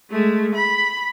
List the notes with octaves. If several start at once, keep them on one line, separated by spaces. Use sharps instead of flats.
G#3 A3
B5